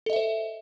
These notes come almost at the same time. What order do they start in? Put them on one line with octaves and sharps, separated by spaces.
A4 D#5 E5 C5